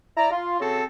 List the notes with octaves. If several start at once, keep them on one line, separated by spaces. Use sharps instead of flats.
E4 D5 A#5
F4
C#3 C4 F#4 A4